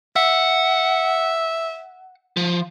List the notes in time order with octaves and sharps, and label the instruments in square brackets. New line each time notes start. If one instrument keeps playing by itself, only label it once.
[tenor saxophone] E5 [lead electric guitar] F#5
[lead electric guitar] F3